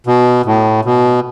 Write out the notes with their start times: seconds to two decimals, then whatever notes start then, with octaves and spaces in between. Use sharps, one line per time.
0.07 B2
0.45 A2
0.85 B2